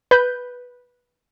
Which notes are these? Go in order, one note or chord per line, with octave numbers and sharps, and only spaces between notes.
B4 G6